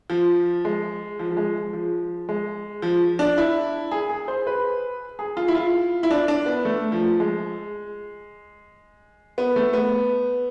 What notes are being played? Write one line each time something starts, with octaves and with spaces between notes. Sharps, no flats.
F3
G#3
F3
F3
G#3
F3
G#3
F3
D4
E4
G#4
G#4
C5
B4
G#4
F4
E4
F4
E4
D4
D4
B3
A3
F3
G#3
B3
A3
B3